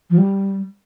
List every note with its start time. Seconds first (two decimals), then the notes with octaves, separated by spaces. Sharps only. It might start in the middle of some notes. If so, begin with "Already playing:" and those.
0.10 F3
0.18 G3